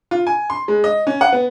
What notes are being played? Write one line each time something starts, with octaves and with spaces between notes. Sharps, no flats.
F4
G#5
C6
G#3
D#5
C#4
F#5
B3